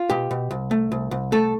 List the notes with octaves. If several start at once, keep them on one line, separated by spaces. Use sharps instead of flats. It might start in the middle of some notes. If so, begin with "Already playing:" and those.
Already playing: F4
B2 G4
B2
C2
A3
C2
C2
A3 A4